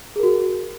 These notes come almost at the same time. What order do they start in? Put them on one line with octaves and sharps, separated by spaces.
G#4 A#4 F#4